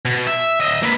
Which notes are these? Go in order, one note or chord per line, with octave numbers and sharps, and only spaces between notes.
B2
E5
D#5 E5
A#3 B4